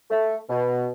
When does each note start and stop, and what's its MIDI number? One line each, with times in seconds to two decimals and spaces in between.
0.10 0.37 57
0.49 0.90 47